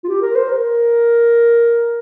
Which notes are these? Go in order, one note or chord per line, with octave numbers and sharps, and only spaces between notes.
F4
G4
A#4
C5
A#4